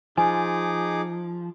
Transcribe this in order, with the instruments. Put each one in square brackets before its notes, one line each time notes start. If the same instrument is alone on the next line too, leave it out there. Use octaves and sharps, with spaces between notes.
[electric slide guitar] F3 [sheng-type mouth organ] D#4 G#4 D6 [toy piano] G#5